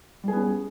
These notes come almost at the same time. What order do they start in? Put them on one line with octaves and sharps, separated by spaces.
G3 G#4 B3 C#4